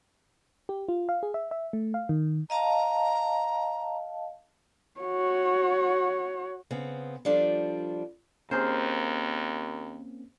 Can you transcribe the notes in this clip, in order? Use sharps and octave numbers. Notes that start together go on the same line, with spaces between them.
G4
F4
F5
G#4
E5
E5
A3
F5
D#3
D#5 F5 A5 A#5
F#4 C#5
C#3 B3 C4
F3 G3 D4 F4 A4
D#2 A#3 C4 C#4 G#4 A#4 C5